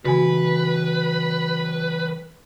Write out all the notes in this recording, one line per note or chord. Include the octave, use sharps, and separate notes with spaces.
C#3 E3 A#3 F#4 B4 G#5